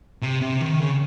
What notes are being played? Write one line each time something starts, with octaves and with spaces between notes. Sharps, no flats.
C3
C3
D#3
C#3